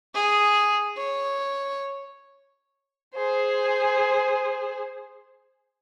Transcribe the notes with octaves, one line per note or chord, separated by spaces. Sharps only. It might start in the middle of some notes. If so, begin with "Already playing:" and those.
G#4
C#5
G#4 C5